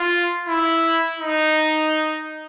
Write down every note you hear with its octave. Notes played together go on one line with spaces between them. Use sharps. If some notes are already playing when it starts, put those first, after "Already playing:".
Already playing: F4
E4
D#4